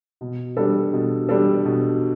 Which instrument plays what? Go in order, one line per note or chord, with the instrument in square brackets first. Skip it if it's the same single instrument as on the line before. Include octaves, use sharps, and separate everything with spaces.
[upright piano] B2
G3 D4 A4
B2
G3 D4 A4
B2